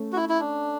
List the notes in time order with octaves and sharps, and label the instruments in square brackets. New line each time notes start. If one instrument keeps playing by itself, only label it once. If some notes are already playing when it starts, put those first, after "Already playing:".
Already playing: [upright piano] A3 C#4
[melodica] F#4
E4
E4
D4